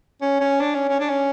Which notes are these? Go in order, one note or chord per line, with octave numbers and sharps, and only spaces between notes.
C#4
C#4
D4
C#4
C#4
D4
C#4